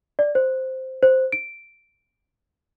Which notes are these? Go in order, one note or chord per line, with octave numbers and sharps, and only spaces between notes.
D5
C5
C5
D7